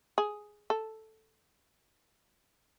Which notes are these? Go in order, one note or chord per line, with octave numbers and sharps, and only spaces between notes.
G#4
A4